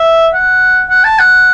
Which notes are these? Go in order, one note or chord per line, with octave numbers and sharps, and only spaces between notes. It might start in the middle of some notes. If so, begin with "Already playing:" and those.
Already playing: E5
F#5
F#5
A5
F#5